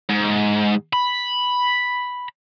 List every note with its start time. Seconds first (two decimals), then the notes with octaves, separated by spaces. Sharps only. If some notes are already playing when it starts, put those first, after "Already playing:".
0.10 G#2
0.93 B5